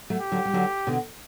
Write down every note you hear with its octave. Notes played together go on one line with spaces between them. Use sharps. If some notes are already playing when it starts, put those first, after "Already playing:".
F#3 A3
G4
D3 F#3
G3
D3 F#3
B2 D3